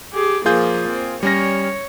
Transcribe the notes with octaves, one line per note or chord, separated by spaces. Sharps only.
G4 G#4
A#2 F3 F4 G#4 G6
C4
G3 C#4 C#5 A#6